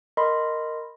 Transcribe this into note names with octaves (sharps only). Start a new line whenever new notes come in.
A#4 D#5 B5 C6